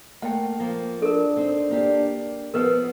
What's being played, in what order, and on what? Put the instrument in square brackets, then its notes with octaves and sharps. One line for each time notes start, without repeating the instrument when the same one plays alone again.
[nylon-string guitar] A3 A#3 [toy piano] F#5 G5
[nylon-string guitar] F3 A#3
[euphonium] D4 [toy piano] A4 A#4
[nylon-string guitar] C4 D#4
A#3 G4 D5
[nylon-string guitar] F3 B3 [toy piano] A#4 B4 F#5